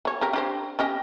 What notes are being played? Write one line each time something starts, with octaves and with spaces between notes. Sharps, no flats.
F#3 C#5
C4 G4 A#4
D4 G4 C5
C#4 G4 D#5